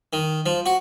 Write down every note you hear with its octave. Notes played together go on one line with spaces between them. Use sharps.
D#3
F3
F#4